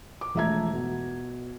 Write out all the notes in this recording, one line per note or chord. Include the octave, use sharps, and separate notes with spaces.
D6
E1 F3 A3 E5 A#5 G#6
B2